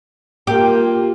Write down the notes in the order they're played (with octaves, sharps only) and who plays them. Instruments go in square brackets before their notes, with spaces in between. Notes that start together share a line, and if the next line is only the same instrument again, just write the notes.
[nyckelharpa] A#3 F4 [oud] G4